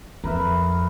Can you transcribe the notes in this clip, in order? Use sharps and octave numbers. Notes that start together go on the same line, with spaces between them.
F2 A#4 B4 E5